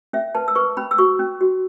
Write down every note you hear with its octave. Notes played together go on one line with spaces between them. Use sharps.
C#4 E5
B4 A5
E6
B4 C#6
C#4 B5
E6
F#4 C#6
C#4
F#4